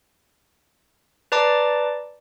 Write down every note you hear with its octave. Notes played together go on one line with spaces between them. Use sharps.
B4 D5 A5 A#5 D6